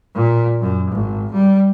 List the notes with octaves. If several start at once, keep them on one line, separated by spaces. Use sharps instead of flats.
A#2
F#2
G#1
G3